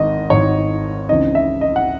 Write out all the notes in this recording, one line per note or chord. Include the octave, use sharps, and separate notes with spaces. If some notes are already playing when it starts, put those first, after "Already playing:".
Already playing: G#1 G#2 D#3 D#5
G#1 G#2 D#3 C#5
C#2 C#3 E3 C4 D#4 D#5
E5
D#5
F#5